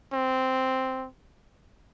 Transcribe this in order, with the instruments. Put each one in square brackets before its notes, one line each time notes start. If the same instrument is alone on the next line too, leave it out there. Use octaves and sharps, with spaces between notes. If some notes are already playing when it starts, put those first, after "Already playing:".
[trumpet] C4